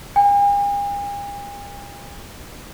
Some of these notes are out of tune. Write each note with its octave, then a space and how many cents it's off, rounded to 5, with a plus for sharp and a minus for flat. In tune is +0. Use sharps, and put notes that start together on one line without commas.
G#5 -45